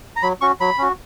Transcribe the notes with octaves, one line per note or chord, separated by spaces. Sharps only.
A#5
F#3 B5
C#4 F#4 C#6
F#3 B5
C#4 F#4